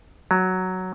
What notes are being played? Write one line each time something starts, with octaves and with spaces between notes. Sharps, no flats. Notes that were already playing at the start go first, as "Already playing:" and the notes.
F#3